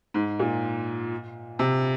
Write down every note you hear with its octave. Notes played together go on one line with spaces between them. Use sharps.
G#2
A#2
C3